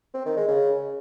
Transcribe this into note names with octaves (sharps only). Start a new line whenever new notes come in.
C4
D#3
G#3
C#3